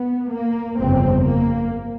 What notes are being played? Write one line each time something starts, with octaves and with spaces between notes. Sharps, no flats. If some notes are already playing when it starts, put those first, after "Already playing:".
Already playing: B3
A#3
G1 F2 C#3 C4
A#3